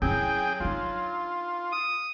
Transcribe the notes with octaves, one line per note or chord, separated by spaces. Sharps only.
F#3 C#4 E4 G#4 G5
D4 D#4 F4
D#6